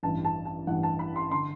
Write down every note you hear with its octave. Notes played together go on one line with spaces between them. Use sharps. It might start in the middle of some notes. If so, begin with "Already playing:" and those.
A1 G2 E3 A5
A5
A5
A1 G2 E3 F#5
A5
B5
C6
D3 C6